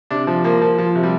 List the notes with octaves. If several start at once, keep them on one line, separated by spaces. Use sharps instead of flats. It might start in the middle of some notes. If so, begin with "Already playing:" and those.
C3 D4
F3
F3 A#3
F3
F3
C3
G3